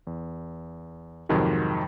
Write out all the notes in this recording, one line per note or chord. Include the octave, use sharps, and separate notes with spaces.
E2
F2 G#2 C3 D#3 F#3